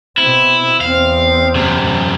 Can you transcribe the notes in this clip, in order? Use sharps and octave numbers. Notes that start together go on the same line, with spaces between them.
B2 C4 E4
E2 C4 F5
F#2 C3